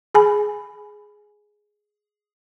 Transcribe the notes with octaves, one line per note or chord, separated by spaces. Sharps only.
G#4 G#5 B5